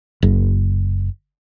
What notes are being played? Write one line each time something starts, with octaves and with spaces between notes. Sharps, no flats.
F#1